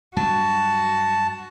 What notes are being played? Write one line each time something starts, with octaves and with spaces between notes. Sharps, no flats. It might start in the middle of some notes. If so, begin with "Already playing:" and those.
G2 F#3 F#4 A5